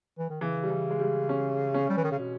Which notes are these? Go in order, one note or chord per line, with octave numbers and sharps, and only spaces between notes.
E3
D#3
C#3 E3
G3
E3
G#3
G3
C#4
C#4
G3
E3
D#3
C#3
B2